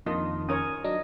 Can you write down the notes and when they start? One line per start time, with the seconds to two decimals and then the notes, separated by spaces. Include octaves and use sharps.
0.06 F2 D#3 A#3 D4 F4 D#5
0.49 C#4 A#4 C#5 D#6
0.84 F#3 D4 D#4 D#5